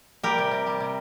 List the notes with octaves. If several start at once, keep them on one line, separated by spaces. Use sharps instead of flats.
G3 G4 A#4
C3
C3
G3
C3